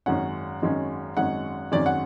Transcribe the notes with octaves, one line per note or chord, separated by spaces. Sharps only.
G#1 F#2 D#3 G#3 C#4 F#5
G#1 F#2 D#3 G#3 C#4
G#1 F#2 D#3 G#3 C#4 F#5
G#1 F#2 D#3 G#3 C#4 D5
F#5